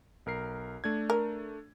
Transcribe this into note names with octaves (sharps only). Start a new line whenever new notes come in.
B1 A#4 C7
A3 D4 G#6
A#4